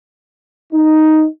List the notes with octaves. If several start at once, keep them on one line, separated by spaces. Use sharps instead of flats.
D#4